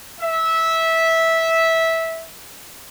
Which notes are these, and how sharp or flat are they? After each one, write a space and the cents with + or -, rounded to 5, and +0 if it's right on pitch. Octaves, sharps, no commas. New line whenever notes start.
E5 -15